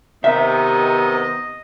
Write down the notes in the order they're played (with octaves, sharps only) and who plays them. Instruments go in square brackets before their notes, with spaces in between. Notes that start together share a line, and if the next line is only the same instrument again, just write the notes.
[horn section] C3 D#3 B3 [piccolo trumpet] D#5 [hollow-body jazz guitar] E5 [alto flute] A#5